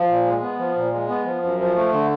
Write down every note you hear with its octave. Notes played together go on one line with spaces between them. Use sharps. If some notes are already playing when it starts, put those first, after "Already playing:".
Already playing: F3
A#2
G#3
B3
F3
A#2
G#3
B3
F3
F#2
F3
A3
D3